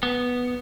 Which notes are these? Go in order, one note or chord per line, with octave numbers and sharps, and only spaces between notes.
B3